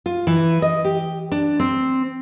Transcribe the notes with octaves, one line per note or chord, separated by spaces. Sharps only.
F4
E3
D#5
G4
D4
C4